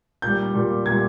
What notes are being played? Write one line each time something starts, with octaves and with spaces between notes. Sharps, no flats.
A#2 G3 G6
A#2 G3
A#2 G3 G#6